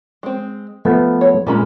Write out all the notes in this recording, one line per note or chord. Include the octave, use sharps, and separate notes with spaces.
G#3 C4
F3 A3 B3 E5
C#5
A#2 G3 G#3 C#4 A#4 B5